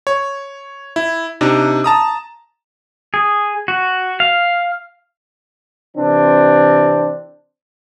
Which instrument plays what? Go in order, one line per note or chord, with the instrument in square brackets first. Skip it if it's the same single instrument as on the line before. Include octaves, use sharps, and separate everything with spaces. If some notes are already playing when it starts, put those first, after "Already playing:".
[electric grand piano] C#5
E4
C3 D4 D#4
A5 A#5 D#6
[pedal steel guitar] G#4
F#4
F5
[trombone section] C3 E3 C4 D4